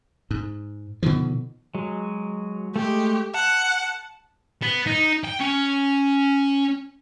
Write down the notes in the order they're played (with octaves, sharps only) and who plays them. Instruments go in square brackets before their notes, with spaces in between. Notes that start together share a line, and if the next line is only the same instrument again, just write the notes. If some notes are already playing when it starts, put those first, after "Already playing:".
[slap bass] G#2
B2 D3 D#3 F3
[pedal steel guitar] F#3 G#3
[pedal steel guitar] G#3 A3 [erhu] G4
[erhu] F#5 [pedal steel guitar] A5
[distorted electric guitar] B3
D#4
G5
C#4